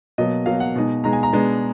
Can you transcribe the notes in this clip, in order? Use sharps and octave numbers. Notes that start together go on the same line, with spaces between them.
B2 F#3 A#3 D#5
B2 F#3 A#3 F5
F#5
B2 G#3 D#4
B2 G#3 D#4 A#5
G#5
A#5
B2 G#3 B3 D4